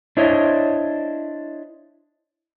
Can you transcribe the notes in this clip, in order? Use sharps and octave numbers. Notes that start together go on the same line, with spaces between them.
D4 E4 C5 C#5 D#5